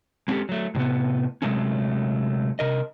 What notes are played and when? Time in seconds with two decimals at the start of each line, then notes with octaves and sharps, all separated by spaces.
0.28 G#3 C4 C#4 E4 G4 A4
0.49 F#3 A3
0.75 A2 C3 A3 B3
1.42 C3 E3 F#3 G#3 A3 C#4
2.59 C3 A#4 D#5